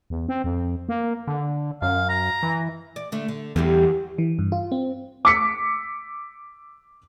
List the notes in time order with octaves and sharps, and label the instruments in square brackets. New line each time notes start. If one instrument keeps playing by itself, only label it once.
[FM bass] E2
C4
F2
A#3
[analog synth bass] D3
[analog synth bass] F#2 [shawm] F5
[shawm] A#5
[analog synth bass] E3
[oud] D5
D3 A3
D3
[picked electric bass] E2 [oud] D3 G3 G4
[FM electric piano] E3
G2
F4
C4
[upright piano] D6 E6 B6 C#7